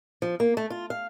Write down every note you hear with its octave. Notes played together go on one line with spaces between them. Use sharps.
F3
A#3
A3
F4
F5